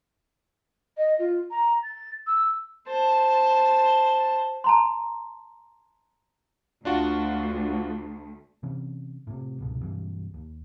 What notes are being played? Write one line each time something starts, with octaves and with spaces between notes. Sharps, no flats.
D#5
F4
A#5
A6
E6
C5 A5
A5 A#5 C6
D2 D4 F4 F#4
C3 E3 C#4
A2 C3
G#1 C#2 B2
B1 G2 E3
D#2